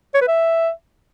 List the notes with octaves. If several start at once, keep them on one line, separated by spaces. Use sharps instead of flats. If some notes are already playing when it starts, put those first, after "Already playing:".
C#5
B4
E5